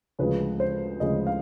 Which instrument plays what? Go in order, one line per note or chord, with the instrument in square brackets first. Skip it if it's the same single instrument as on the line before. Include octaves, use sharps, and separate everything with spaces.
[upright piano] D2 C#3 F3 G#3 B4
C5
D2 C#3 F3 G#3 D#5
F5